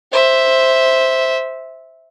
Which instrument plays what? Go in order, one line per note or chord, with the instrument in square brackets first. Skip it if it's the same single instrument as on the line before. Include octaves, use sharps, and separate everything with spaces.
[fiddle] C5 E5